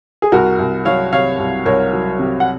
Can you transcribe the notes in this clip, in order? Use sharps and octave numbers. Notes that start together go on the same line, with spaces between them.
G#4
C2 F#4 A#4
C2
F#3 C#5 F5
C3 C#5 F5
C2
C2 A#4 C#5
F#3
C3
F#5